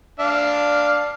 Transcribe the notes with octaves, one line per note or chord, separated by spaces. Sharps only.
D4 F5